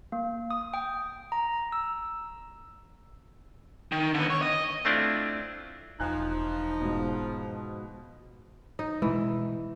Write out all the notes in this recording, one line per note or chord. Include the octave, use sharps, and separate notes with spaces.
A#3
D#6
G5
A#5
E6
D#3
D3 B3
C#5
D#5
A3 C4 D4 E4 F4 D5
E1 F3 D#4 G#5 F#6
G#2 B2
D#4
B2 E3 G#3